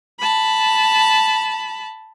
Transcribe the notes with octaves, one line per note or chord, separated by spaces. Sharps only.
A5 B5